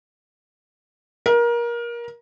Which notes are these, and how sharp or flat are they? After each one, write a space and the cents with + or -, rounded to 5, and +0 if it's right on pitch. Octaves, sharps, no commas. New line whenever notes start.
A#4 +25